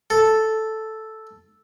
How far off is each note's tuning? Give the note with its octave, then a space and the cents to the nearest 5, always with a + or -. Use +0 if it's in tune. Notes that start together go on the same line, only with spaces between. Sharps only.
A4 +0